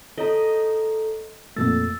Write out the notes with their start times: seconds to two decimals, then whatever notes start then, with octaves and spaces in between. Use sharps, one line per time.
0.18 A4 C#5 D#5 A#5
1.56 F2 A#2 A3 E6 A6